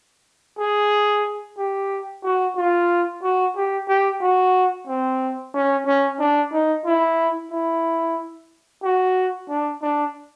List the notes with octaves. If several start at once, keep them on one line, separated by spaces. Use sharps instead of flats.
G#4
G4
F#4
F4
F#4
G4
G4
F#4
C4
C#4
C#4
D4
D#4
E4
E4
F#4
D4
D4